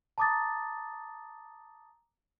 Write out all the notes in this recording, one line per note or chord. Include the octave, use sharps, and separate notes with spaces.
A5 A#5 D6 D#6 A6